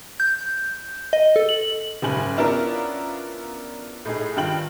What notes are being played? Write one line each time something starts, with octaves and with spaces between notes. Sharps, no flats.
G6
D#5
A4
F#7
F#1 G#2 C#3 G#5 F#7
B3 C#4 D4 E4 F4 A#4
A2 D#4 G#4
G2 D#3 F4 G5 F#7